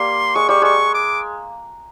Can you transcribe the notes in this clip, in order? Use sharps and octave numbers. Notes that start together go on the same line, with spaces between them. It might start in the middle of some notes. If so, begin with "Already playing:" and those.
Already playing: G3 A#3 C6
G#3 C#6
G3 C#6
G#3 C#6
D6